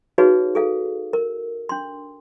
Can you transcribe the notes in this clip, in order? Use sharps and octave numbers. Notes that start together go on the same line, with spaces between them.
D#4 F#4 G#4 B4 C#5 F5
G#4 A4 F5
A#4
D4 C6